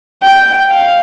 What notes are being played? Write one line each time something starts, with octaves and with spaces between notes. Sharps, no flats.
G5
F5